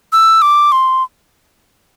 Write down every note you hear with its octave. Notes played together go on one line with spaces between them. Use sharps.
E6
D6
C6